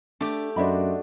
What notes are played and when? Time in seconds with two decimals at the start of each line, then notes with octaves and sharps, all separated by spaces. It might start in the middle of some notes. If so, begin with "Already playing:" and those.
0.21 A3 D4 G4
0.56 F#2 D4 F#4 C5 D#5 E5 B5